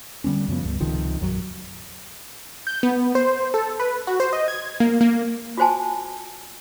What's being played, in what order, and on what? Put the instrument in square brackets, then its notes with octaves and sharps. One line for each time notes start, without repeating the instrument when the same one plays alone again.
[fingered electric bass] D3 G3 B3 C#4
F#2 C#3 F3 B3
C#2 G2
C#2 C3 D#3 F3
A#1 F#2 F3 F#3
[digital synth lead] G6
B3
C5
A4
B4
F#4
C5
D#5
G#6
A#3
A#3
[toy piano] F4 F#4 C5 G#5 A5